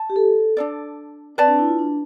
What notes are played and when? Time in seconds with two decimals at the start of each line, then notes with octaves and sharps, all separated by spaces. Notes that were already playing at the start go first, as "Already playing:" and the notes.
Already playing: A5
0.10 G4
0.16 A4
0.57 D4 A4 D5
1.37 C4 B4 D5 A5
1.48 D4
1.59 E4
1.68 F4
1.79 D4